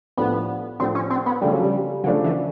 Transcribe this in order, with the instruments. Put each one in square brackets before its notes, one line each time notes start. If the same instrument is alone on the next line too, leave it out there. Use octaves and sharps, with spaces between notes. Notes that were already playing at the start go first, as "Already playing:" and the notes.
[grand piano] A2 F3 A3 D4 G4 [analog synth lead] B3
[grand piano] A2 F3 A3 D4 G4 [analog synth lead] C4
[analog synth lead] C#4
C4
B3
[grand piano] C#3 F3 A3 D4 [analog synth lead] G3
[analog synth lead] F#3
G3
[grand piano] C#3 F3 A3 D4 [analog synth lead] F#3
[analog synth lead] E3